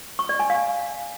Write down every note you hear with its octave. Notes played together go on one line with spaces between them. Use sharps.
C#6
D5
G#5
F5